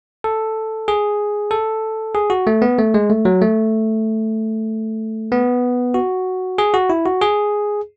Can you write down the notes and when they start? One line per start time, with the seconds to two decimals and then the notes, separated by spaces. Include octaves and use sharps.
0.24 A4
0.88 G#4
1.51 A4
2.15 G#4
2.30 F#4
2.47 A3
2.62 B3
2.79 A3
2.94 G#3
3.10 A3
3.25 F#3
3.42 A3
5.32 B3
5.94 F#4
6.58 G#4
6.74 F#4
6.90 E4
7.06 F#4
7.21 G#4